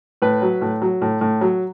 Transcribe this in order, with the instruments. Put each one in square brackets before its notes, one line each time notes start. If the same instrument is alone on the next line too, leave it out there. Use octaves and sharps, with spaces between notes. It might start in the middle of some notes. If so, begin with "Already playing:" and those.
[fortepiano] A2 B4
F#3
A2
F#3
A2
A2
F#3